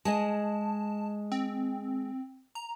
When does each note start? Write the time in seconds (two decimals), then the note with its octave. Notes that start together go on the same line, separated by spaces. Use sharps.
0.05 G#3 G#4 D#5 A5
1.32 C4
2.55 A#5